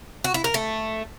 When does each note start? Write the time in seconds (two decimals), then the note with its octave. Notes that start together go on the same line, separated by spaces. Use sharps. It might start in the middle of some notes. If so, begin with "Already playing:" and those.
0.24 F#4
0.34 E4
0.44 A#4
0.54 A3